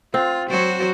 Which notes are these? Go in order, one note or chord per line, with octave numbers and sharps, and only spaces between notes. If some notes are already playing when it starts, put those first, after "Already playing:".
C4 F4
F#3 F#4 C5